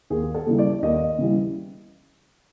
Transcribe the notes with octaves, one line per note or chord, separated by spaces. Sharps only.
D#2 G#4
A4
C#3 E3 G3
D5
D#2 D#5
C#3 E3 G3